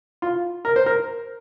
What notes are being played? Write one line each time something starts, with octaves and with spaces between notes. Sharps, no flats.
F4
A#4
C5
A#4